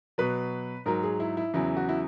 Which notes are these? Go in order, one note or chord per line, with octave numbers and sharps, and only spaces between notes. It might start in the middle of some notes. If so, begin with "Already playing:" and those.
B2 F#3 B4
G#2 F#3 A#4
G#4
E4
E4
E2 C#3 F#3 E4
F#4
E4